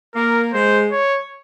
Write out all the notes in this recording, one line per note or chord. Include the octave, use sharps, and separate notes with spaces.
A#3 A#4
G#3 C5
C#5